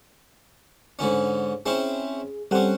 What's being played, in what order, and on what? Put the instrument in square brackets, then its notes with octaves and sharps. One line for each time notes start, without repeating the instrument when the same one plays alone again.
[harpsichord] G#2 D3 C#4
[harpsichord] C4 C#4 E4 [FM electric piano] G#4
[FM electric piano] G3 A4 F#5 [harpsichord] C4 C#4